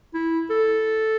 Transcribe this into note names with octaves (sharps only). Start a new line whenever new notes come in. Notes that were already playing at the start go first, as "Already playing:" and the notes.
E4
A4